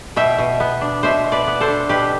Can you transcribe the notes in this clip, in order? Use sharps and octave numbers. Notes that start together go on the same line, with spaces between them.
B2 E5 G5
B2
B3
D4
B2 C5 E5
B2
B4 D5
B3
A4 C5
D4
B2 G4 B4